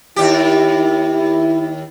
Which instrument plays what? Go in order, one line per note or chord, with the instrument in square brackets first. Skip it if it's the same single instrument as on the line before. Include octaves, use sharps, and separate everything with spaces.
[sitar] D#2 G4 [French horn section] E4